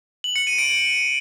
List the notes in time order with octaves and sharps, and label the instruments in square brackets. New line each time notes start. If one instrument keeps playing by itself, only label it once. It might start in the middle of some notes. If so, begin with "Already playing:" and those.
[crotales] F#7
C#7
D#7
D7
D7